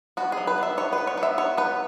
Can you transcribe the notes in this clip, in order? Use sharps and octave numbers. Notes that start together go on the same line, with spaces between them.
B3 F#4
G#4
F#3
B4
B3
E5
B3 C#5
B4
B3
C#5
B3
E5
B3 C#5
B3 B4